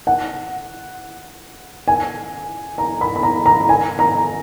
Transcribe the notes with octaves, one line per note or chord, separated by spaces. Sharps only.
F#5
G#5
A#5
B5
B5
A#5
A#5
G#5
A#5